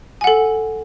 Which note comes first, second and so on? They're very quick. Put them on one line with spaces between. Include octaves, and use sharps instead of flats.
G#5 F#5 A4